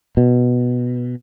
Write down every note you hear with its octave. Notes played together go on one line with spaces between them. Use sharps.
B2